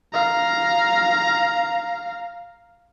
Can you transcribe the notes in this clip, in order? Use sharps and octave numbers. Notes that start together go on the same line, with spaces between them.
F5 A#5